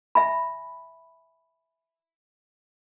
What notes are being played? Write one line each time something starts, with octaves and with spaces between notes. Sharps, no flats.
E5 G#5 B5